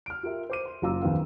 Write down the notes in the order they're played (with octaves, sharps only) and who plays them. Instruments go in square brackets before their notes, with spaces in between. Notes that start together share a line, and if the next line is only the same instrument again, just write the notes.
[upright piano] F6 D7
F4 G4 A#4 E5
C5 D6 D#7
C6
F#1 F4 F5 A#5 D6 E6
A#1 D#2 E3 C4 A#4 F5